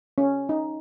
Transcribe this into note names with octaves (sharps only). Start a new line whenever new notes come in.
C#4
D#4